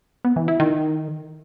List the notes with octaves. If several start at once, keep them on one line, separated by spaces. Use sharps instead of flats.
B3
E3
E4
D#3